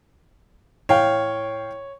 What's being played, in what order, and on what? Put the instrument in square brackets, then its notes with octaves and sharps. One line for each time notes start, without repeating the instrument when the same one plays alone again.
[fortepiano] A2 F5 G5 [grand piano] C#5